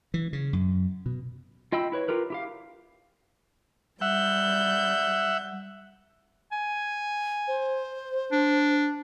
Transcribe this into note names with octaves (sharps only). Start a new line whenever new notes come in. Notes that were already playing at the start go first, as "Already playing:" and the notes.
E3
C#3
F#2
B2
F4 D#5 G5 B5 E6
E4 B4 C#5
F4 G4 A#4 B4
E4 G4 F5
G3 E5 F#5 G6
G#5
C5
D4